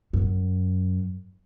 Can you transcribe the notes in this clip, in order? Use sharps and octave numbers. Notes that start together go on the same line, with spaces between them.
F#2